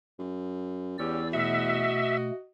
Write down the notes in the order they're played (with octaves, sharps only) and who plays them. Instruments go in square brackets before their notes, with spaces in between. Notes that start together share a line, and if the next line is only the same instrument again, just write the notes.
[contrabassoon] F#2
[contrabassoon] E2 [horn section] B3 C#4 G4 [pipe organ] D5 E6
[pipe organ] B2 A3 [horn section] F#4 D#5 [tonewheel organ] E5